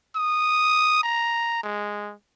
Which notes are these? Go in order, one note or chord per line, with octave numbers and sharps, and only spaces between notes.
D#6
A#5
G#3